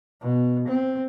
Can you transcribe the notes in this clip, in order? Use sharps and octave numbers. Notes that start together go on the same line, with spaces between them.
B2
C4